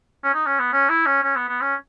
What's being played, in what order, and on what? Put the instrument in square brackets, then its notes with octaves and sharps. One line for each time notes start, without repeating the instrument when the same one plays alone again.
[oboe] C#4
D#4
C#4
B3
C#4
E4
C#4
C#4
B3
B3
C#4